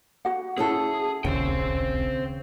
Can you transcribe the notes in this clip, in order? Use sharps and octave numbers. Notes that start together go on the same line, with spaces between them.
F#4 F#5
C#4 E4 G#4 A4
D1 A#1 D#2 C#3 C5 G5